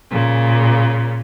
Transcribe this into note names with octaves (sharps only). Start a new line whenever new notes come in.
A#2 C#3